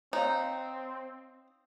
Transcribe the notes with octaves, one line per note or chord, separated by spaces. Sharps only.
C4 D#4 C5 C#5 F5